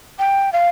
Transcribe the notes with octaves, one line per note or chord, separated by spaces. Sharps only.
G5
F5